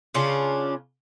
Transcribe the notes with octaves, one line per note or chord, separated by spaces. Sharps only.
C#3 C#4 D4 F4